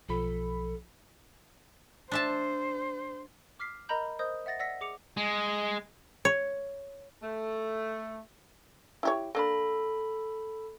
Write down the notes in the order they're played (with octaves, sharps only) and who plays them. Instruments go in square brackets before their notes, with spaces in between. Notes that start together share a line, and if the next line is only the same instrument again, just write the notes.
[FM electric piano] B1 F3 B5 [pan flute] A4
[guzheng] D4 E5 A5 [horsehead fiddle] C5
[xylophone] D6 F6 B6 C7
A#4 D#5 A#5 B5 G6
A#4 C5 D#5 D#6 G6
E5 F#5 A6 A#6
D5 F#5 E6 A#6 B6
G#4 D6 C#7 F7
[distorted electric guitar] G#3
[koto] C#5
[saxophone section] A3
[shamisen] E4 G4 C#5
[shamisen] A#3 D4 [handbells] A4 B5